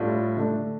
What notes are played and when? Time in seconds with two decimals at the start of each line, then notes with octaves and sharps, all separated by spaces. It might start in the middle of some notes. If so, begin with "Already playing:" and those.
Already playing: A2 G3 D4 F4
0.36 D3 A3 D4